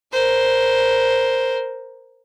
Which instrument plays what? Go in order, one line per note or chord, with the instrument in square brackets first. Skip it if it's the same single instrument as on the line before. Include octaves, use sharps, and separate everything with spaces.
[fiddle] A#4 C5